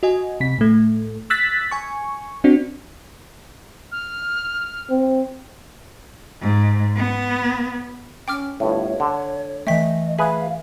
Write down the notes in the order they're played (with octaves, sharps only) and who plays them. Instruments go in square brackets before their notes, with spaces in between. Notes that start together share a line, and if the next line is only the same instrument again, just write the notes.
[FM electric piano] F#4 D#5 G#5
C3 B6
A2 A3
E6 F#6 A6 B6
G#5 C#6
C4 D4 F#4
[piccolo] F6
[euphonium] C4
[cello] G#2
B3
[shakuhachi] C#4 [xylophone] G5 D6 F6
[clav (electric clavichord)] G1 A2 [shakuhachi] C#5
[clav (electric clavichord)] D3
[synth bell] E3 A3 [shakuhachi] D#5 [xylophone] E5 G5 B6
[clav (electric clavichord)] G#4 B4 [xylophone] E5 [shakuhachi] F5